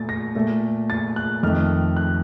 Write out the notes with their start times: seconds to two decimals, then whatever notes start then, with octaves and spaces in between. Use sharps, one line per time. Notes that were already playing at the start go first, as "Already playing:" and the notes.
Already playing: A#2 A3 A6
0.09 A#6
0.35 A#2 A3
0.90 A6
1.16 F#6
1.43 F2 D#3 A3 F6
1.97 F#6